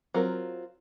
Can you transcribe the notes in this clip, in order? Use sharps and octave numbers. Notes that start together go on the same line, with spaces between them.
F#3 C4 F4 A#4